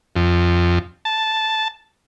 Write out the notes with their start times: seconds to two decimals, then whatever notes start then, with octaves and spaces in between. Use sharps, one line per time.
0.16 F2
1.05 A5